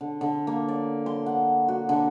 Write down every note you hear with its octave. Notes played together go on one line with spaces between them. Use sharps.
D3
D3
A#3
D5
C6
F#5
F#4
D3